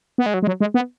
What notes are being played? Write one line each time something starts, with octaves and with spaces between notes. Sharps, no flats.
B3
G#3
F#3
G#3
F#3
G#3
B3